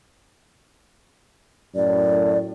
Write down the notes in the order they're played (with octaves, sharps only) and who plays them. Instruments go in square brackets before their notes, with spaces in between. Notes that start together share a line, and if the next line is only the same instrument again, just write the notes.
[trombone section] F#2 A2 [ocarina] D5